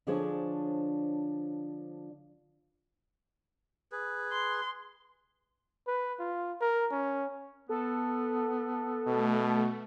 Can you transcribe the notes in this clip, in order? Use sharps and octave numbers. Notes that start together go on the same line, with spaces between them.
D3 F3 D4 G#4 C5 C#5
G#4 B4
C6
B4
F4
A#4
C#4
B3 A4
B2 A3